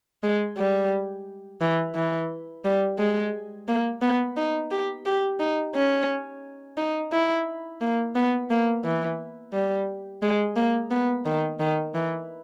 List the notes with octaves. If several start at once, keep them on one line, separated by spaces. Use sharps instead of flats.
G#3
G3
E3
E3
G3
G#3
A#3
B3
D#4
G4
G4
D#4
C#4
D#4
E4
A#3
B3
A#3
E3
G3
G#3
A#3
B3
D#3
D#3
E3